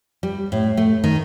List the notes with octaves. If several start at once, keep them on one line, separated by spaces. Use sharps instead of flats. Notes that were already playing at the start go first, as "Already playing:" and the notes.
G3
A2
A3
D#3